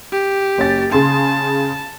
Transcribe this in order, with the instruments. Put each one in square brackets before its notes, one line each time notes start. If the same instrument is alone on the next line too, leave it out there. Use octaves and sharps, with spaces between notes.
[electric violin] G4
[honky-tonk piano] F#1 C#4 A6
[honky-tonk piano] C#3 G#4 C6 [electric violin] A5